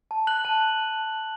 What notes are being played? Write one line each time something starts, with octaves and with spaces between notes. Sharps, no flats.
A5
F#6 F#7
A5